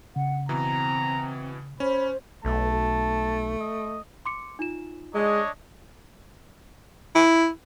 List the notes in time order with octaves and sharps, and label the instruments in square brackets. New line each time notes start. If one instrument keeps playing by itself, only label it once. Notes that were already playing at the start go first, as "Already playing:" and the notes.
[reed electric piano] C#3 [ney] F#5
[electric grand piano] B2 E3 [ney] C4 [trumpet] A#5
[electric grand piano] C#4 [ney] C5 [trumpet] B5
[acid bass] B1 [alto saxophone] A3 [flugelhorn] A5
[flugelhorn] D#5
[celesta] C6 D6 C#7
D#4 F4 E7
[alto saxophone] G#3 [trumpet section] D4 C#5 D#5
[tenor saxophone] E4